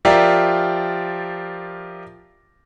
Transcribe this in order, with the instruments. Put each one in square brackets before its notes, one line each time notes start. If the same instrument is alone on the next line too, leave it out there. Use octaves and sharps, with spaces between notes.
[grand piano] F3 F4 G4 A#4 D5 E5